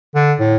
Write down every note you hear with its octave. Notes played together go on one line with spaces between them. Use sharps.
D3
A2